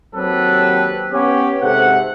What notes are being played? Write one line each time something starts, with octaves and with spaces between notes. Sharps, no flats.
D#2 F#3 C4 G4 A4 B4
B3 C#4 G4
G#2 C3 A4 F#5